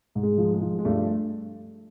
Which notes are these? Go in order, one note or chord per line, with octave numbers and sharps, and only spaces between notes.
G#2
G#3
F3
G#3
F3
G#3
G2 A3